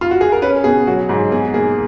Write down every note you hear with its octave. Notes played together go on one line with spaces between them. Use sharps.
F4
F#4
G#4
A#4
C#4 B4
B2 G#4
F#3 F#4
G#2 G#4
B2 G#4
A#3 G#4